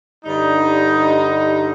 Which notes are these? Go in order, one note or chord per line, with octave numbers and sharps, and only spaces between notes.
G2 D3 G3 D#4